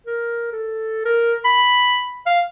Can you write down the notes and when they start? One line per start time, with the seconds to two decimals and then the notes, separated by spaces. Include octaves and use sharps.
0.07 A#4
0.52 A4
1.05 A#4
1.45 B5
2.26 F5